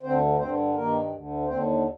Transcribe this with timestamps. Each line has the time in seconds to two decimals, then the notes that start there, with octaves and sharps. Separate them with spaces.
0.03 D2 D3 C4 C5
0.39 G2 D3 C4 C5
0.75 G2 D#3 A#3 A#4
1.11 D2 D3
1.47 D#2 D3 C4 C5